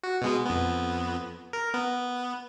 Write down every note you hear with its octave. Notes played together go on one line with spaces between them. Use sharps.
F#4
B2 G#3 B3
F2 B3
A#4
B3